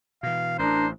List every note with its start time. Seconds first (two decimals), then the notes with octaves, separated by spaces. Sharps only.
0.23 B2 E3 F5
0.59 A1 D4 A#4 C5